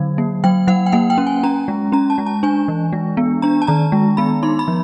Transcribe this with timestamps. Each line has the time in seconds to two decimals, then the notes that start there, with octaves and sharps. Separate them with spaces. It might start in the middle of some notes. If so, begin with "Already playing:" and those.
Already playing: D3 F#3
0.18 A#3
0.44 F#3 G5
0.67 F#3 F#5
0.86 G5
0.92 A#3 F#5
1.10 G5
1.18 C#4
1.27 G#5
1.43 C#4 A#5
1.68 G#3
1.92 C#4 A#5
2.10 A5
2.18 G#3
2.26 A5
2.43 D4 G#5
2.68 E3
2.93 G#3
3.17 B3
3.42 D4 A#5
3.62 A5
3.67 D#3 A#5
3.92 G#3
4.17 B3 B5
4.43 D#4 C6
4.59 B5
4.68 F3